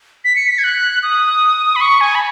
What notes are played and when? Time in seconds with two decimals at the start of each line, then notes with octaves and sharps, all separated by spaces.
0.25 B6
0.36 C#7
0.48 B6
0.58 G#6
0.64 F#6
1.03 D#6
1.76 B5
1.81 C#6
2.01 G#5
2.15 B5